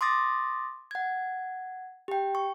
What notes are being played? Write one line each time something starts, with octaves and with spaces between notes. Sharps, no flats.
C6 D6 D#6 A6 A#6
F#5 G#6
G4 G5
C#6